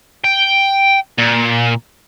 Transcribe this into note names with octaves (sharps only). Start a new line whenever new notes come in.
G5
A#2